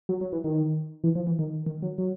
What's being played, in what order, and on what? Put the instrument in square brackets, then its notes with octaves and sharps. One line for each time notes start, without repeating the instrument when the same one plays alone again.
[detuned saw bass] F#3
F#3
E3
D#3
E3
F3
E3
D#3
D#3
F#3
F#3